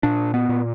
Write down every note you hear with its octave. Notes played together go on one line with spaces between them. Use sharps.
A#2 D4
B3
A#2